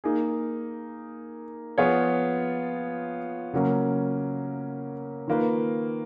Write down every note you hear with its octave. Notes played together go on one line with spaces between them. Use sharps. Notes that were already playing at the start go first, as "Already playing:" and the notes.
A#3 D#4 G#4
F3 B3 F4 G#4 C#5
C#3 F#3 A#3 C#4
D#3 A#3 F4 B4